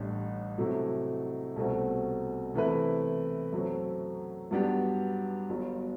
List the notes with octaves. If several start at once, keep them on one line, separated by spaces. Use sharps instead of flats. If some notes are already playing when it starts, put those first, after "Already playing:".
Already playing: A1 A2 G3 D4
C3 F#3 A3 E4
C2 B2 A3 C4 F#4
C3 E3 A3 E4 B4
F#2 F#3 A3 C4
G2 F#3 B3 D4 G4
G1 G2 F#3